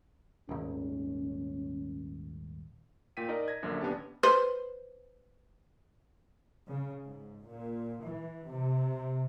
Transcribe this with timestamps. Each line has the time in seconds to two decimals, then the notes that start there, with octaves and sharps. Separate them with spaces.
0.49 D#1 G#1 C#4
3.17 A#2 G5 B6 D#7
3.28 D#4 A#4 D5 D#5
3.48 G#6 A#6
3.62 A#1 F#2 D3 A#3
3.81 D#2 B3 C#4 D4 G4 A5
4.23 B4 C5
6.67 C#3
7.04 G#2
7.44 A#2
8.05 E3
8.47 C3